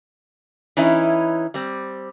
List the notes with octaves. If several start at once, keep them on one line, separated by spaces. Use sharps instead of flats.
E3 C#4 D#4 E4
G3 C4